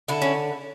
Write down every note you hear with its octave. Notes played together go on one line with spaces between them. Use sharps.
D3 E4
C#4